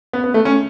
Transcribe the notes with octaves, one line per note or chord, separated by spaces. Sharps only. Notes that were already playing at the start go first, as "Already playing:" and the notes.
B3
B3
A3
C#4